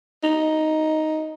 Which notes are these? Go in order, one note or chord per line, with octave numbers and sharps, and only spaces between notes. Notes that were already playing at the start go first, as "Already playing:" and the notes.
D#4